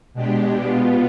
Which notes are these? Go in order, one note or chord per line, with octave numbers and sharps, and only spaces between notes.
B2 G#3 D4 G4
B2 B3 F4